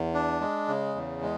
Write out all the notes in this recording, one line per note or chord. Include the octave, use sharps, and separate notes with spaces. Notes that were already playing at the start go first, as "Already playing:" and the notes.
Already playing: E2
D4
G#3
C#3
E2
G#3